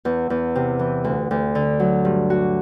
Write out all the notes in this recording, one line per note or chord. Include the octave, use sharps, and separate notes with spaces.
E2
E2
C3
E3
D2
D2
D3
F#3
G2
F#4